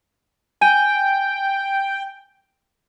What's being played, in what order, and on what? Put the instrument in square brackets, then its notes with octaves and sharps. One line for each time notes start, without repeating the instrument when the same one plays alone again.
[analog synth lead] G5 [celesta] G#5 D#7